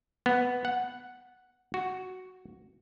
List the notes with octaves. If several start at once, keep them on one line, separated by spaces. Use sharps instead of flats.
B3
F#5
F#4